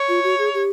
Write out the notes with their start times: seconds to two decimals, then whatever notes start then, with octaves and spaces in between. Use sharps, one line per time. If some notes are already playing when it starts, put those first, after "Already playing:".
Already playing: C#5
0.09 F4
0.24 F#4
0.38 G#4
0.54 G4